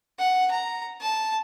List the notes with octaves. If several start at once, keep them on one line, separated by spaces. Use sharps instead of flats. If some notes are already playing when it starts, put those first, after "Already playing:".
F#5
A#5
A5